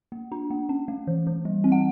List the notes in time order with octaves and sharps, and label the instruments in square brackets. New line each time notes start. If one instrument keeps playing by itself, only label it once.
[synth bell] A#3
D4
A#3
C#4
A3
E3
E3
G3
C4
F#5